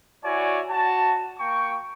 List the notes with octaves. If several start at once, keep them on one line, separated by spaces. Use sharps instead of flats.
E4 F#4 C#5 D5 G#5
F#4 A5
A#3 G5 C#6